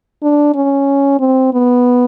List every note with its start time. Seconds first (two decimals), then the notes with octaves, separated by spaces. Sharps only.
0.23 D4
0.55 C#4
1.20 C4
1.53 B3